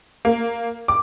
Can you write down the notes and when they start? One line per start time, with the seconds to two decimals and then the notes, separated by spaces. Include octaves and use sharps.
0.25 A#3
0.88 D6